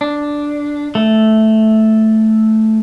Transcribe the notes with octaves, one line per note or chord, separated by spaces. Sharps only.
D4
A3